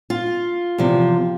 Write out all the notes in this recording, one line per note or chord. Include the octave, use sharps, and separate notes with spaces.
F4
E2 C3 F3